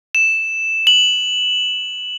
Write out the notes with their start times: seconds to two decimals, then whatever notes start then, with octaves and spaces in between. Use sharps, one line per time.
0.15 E7
0.87 F#7